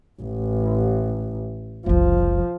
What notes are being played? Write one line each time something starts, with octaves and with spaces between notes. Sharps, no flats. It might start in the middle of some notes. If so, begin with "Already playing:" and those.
A1
F#1 C2 F3